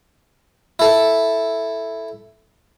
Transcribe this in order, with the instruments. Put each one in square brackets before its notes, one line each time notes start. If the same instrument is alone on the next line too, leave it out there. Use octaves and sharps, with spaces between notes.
[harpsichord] E4 A4